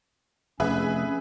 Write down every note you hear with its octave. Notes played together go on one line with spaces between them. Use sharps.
F1 C#4 G#4 B4 E5